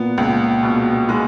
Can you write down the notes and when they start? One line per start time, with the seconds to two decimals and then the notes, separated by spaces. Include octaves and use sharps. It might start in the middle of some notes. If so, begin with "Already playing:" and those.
Already playing: A#2 B3
0.18 C#2
0.63 B2
1.09 G#3